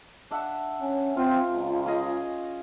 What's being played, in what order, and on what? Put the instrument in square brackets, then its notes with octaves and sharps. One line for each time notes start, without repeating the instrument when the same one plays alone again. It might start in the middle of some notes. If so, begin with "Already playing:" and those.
[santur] D4 E5 F#5
[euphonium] C#4
[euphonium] C4 [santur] F4
[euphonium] C#2
[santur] C#4 G#4 D#5